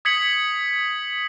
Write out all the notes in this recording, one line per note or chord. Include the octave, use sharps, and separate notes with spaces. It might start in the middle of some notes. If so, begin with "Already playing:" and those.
D#6 G#6 B6 C#7 F#7